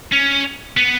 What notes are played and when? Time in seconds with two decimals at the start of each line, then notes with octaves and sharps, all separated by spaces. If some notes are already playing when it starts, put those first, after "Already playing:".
0.12 C#4
0.77 B3